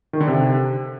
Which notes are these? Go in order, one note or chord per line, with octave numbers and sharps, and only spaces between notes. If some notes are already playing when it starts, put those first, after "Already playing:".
D#3
D3
C3